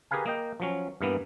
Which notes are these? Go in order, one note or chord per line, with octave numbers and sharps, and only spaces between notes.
G4 G#4 A#4 B4 F5 G#5
A#3 D#5 G5
F3 F#3 C#4
G2 E3 A#3 B3